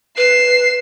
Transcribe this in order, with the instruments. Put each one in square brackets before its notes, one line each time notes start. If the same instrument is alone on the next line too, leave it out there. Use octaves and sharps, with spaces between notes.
[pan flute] B4 [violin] C7 E7